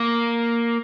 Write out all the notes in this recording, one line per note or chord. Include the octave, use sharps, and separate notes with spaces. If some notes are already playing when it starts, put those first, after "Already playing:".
Already playing: A#3